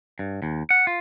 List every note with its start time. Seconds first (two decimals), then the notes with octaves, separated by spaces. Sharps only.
0.19 G2
0.42 D#2
0.70 F#5
0.87 F4